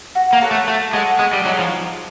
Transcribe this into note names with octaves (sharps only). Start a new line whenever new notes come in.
F#4
A#3
A4 C#5 F#5
A3
A3 F#4
G#3 A4 C#5 F#5
G#3 B3
G3
F#3 D#4 G#4
F3